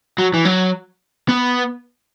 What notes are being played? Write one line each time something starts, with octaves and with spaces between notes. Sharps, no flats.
F#3
E3
F#3
B3